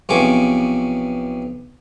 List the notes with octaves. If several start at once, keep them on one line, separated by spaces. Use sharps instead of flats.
B1 C3 F3 G#4 C#6 D6